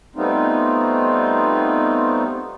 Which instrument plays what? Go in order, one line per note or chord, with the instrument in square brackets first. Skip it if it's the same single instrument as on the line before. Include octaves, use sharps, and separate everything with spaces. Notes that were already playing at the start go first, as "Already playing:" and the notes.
[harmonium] G3 A3 B3 C4 D#4 F4